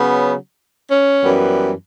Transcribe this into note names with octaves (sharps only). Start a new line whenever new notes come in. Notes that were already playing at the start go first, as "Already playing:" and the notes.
Already playing: C#3 F#3 B3
C#4
F#2 E3 G3 B3